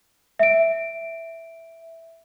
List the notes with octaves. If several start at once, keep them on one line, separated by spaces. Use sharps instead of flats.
E5 D7